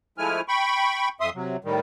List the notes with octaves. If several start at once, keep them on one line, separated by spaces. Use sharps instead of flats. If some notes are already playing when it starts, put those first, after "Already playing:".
F3 G#3 A3 E4 G#5 F6
G5 B5 C#6
F2 E5 C6 D#6
C3 F#3
A2 D#3 G3